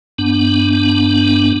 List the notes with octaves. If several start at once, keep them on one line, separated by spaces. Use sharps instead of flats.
G2 B3 D4